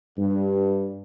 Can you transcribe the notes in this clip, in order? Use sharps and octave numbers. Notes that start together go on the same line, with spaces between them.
G2